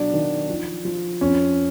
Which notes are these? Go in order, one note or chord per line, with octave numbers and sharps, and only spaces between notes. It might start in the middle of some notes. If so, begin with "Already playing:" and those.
Already playing: B2 F#3 D4
D#3
F3
F3
F2 C#4